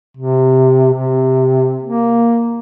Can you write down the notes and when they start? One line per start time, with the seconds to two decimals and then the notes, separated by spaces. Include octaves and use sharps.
0.17 C3
0.94 C3
1.83 A#3